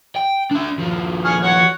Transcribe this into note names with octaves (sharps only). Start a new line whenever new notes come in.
G5
D4 E5
D#2 F3
G#4 C#6 F6
C#5 F#5 C#6